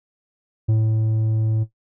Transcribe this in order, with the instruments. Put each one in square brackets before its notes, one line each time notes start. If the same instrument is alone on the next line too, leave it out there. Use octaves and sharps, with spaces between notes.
[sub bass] A2